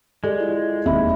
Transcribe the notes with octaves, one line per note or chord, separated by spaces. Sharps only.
G#3 G4 A4 D5
E4 F4
E1 D#2 C4 E5 B5